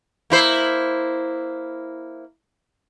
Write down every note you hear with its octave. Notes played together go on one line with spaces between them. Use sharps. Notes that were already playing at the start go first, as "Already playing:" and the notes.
A#3 E4 C5